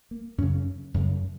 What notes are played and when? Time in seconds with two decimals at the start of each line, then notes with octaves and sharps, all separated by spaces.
0.11 A#3
0.38 F#2 C#3 C#4
0.94 F#2 C#3